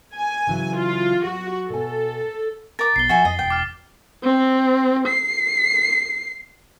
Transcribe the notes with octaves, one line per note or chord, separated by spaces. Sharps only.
G#5
C#3 E3 F#3
F4
F#3 F#4
B2 A4 G#5
A#4 D6 A6
B1 B3 C7 G7
F3 F#4 E5 G#5
F2 D#5
E1 G5
D6 F6
C4
C7